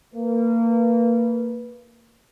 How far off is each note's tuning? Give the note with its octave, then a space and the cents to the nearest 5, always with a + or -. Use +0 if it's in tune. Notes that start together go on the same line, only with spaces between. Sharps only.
A#3 -25 B4 -15